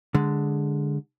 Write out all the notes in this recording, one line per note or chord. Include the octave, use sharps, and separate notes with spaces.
D3 G#3